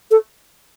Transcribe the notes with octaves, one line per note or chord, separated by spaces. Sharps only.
A4